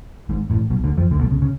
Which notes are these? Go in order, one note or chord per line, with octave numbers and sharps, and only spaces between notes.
G#1 G#2
A1 A2
B1 B2
D2 D3
F2 F3
D2 D3
B1 B2
C#2 C#3
C#3